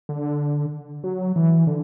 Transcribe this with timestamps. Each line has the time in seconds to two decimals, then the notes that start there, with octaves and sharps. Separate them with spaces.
0.09 D3
1.04 F#3
1.36 E3
1.67 D3